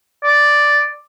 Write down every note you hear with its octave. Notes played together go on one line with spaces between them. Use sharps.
D5